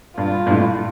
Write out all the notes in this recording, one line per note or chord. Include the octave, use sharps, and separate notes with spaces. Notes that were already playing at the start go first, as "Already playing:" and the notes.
G2 F4
G2
A2